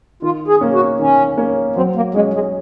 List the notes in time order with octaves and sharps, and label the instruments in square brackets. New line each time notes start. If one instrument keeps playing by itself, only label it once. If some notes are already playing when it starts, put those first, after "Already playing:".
[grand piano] D#3 [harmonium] F4
[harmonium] G#4
[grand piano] A#3 C#4
[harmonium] F#4
[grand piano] D#3 [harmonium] C#4
[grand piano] A#3 C#4
[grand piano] F#3 [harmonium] C4
[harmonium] A#3
[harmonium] G#3 [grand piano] C#4 G#4
[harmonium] G#3